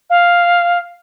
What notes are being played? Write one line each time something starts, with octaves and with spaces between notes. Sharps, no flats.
F5